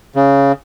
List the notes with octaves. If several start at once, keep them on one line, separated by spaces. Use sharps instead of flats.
C#3